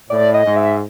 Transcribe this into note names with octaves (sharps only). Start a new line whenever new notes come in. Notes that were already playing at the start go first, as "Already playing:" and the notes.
A2 D5
D#5
G#2
E5